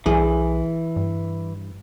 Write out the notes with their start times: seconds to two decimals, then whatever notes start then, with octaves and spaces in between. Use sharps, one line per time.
0.06 B1 E3 G#4
0.96 G2